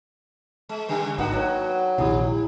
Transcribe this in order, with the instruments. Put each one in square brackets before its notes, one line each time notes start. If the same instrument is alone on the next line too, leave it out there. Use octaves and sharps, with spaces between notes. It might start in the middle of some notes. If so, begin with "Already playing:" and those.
[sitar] G#3
C#3 G3 A3
[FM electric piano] G#1 [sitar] A#3 D4 F#4 [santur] D#4 F#5 G5
[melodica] F#3 [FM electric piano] A4
[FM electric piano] A#1 D#2 C3 [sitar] G3 [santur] E4 D#6